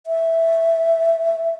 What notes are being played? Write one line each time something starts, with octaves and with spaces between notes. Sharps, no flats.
E5